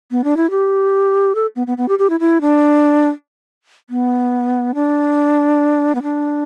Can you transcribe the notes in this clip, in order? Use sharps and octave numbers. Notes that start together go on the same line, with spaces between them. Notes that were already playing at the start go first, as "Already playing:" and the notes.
B3
D4
E4
G4
A4
B3
B3
B3
G4
G4
E4
E4
D4
B3
D4
B3
D4